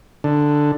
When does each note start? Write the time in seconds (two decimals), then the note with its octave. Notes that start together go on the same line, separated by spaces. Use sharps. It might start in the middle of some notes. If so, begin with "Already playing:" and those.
0.24 D3